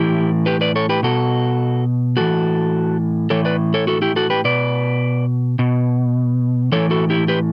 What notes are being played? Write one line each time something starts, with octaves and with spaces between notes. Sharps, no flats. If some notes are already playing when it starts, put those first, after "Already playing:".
Already playing: A2 E3 E4 G4
G4 B4
B4 D5
A4 C#5
G4 B4
B2 F#4 A4
A2 E3 F#4 A4
A2 E3 A4 C#5
B4 D5
A4 C#5
F#4 A4
E4 G4
F#4 A4
G4 B4
B2 B4 D5
B2
A2 E3 A4 C#5
F#4 A4
E4 G4
G4 B4